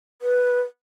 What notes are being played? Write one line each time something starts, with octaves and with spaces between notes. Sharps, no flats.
B4